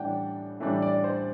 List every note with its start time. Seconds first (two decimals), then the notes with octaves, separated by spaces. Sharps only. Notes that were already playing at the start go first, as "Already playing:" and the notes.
Already playing: A2 E3 G3 D4 F#5 G5
0.60 A2 E3 G3 D4 E5
0.82 D5
1.04 C5